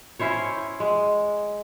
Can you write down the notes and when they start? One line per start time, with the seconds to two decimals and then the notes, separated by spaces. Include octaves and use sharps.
0.19 C#4 E4 C5 C#5
0.80 G#3